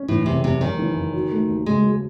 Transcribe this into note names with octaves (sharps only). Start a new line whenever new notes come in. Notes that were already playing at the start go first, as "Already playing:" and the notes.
Already playing: C#4
A2 E3
F#1 C3
F#1 C3
F#2 D#3
E3
F#1
F#3
A3
D#2
C#3 G#3
F#3